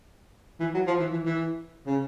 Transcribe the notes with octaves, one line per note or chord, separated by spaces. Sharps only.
E3
F#3
F3
E3
E3
E3
C#3